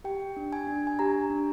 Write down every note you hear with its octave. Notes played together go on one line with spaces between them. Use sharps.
G4 G5
D4
G#5
D4
G#5
G4 A#5
D4